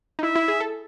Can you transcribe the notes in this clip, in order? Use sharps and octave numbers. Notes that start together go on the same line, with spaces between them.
D#4
E4 E5
E4
G#4
A4